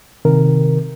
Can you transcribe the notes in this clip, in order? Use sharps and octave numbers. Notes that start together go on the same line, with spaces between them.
C3 D#3 A#4